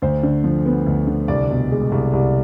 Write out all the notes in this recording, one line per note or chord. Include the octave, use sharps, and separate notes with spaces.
D2 C5
D3
F3
B3
D2
D3
C2 D5
B2
G#3
C2
C2